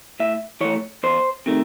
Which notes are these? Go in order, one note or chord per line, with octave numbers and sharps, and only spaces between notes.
A2 E5
E3 A3 C#5
E2 C5
C3 D#3 A3